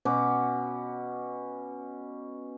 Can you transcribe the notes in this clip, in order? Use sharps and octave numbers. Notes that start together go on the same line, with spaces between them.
B2 C#4 D6